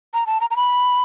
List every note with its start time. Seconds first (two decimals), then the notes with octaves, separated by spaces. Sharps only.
0.14 A#5
0.27 A5
0.41 A#5
0.51 A#5
0.56 B5